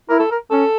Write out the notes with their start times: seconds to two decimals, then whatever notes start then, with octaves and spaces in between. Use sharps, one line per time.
0.09 E4 A#4
0.20 A4
0.31 A#4
0.51 C#4 A4